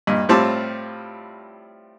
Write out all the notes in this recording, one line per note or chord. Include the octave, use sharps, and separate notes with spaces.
G2 A#2 D#5
A2 G3 C4 F4 A5 D6